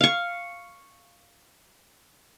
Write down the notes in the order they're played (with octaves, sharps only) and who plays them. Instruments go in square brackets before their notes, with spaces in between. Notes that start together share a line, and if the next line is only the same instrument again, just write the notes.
[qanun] F5 C#6